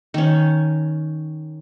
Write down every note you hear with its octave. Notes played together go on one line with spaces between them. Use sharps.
D#3 C#4